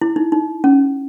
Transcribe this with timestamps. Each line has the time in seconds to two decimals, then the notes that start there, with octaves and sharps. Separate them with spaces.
0.01 E4
0.16 D#4
0.32 D#4
0.64 C#4